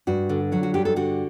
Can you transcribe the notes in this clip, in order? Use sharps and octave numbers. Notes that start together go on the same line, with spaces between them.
G2 F#4
D3
F#3 F#4
F#4
G2 G4
A4
D3 F#4